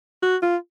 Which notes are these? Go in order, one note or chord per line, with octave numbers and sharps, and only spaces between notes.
F#4
F4